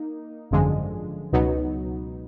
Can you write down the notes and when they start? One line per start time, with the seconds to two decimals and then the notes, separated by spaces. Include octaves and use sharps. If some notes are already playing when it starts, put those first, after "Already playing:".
Already playing: A#3 D#4
0.51 G#1 F#2 D3 F3 G#3
1.33 C#2 B2 F#3 B3 D#4